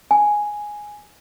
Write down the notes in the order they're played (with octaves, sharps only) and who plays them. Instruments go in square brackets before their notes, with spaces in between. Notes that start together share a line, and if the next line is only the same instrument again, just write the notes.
[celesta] G#5